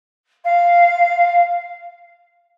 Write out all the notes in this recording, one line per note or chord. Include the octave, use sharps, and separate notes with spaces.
F5